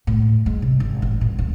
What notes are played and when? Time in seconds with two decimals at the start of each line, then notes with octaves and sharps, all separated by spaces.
0.07 A2
0.46 G#3
0.62 C3
0.80 G#1
1.02 A1
1.21 A#2
1.39 D1